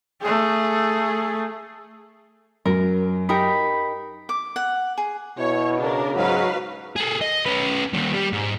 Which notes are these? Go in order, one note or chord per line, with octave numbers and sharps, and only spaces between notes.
A3 G#4
F#2 A#4
D#4 G4 A#4 B5
D6
F#5
G#4
B2 E4 C#5
C#3 D4 A#4
G#2 F#3 F#4 B4 F5
G#4 A4
D#5
C#4 B4
D#2 G3
G3
G#2